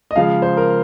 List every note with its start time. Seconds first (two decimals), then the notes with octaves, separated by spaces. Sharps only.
0.11 D#5
0.16 C#3 F3 G#3 F5
0.42 C5
0.57 A#4